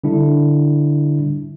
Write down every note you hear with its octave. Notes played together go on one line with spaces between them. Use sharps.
D3 G3 D4 E4